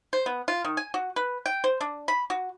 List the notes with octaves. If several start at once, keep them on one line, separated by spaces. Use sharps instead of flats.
C5
B3
F4
D#3
G#5
F#4
B4
G5
C5
D4
B5
F#4